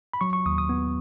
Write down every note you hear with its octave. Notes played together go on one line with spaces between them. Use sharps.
B5
F#3 C#6
C#6
D#2 D#6
D#6
B3